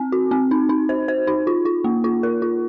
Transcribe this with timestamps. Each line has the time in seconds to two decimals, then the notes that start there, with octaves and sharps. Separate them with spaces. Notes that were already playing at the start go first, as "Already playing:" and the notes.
Already playing: C4
0.12 F#4
0.31 C4
0.51 D#4
0.69 D#4
0.89 C5
1.08 C5
1.27 D#4
1.47 F4
1.65 F4
1.84 A#3
2.04 F4
2.23 A#4
2.42 F4